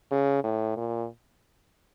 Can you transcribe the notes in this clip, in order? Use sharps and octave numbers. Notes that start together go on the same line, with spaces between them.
C#3
A2
A#2